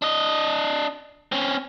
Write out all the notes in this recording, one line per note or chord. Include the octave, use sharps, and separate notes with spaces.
D4 D#5
C4 C#4